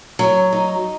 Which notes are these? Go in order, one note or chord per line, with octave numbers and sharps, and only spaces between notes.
F#3
D#4